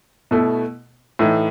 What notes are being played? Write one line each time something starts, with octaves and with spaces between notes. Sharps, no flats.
B2 A3 E4
A2 E3 A3 D#4